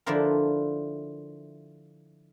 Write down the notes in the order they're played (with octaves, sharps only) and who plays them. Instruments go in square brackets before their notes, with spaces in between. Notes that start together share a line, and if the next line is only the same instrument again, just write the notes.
[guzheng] D3 F3 D4 E4 F4 A#4